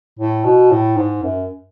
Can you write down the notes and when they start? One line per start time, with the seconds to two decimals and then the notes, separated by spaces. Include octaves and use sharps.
0.19 A2
0.45 B2
0.71 A2
0.97 G#2
1.23 F#2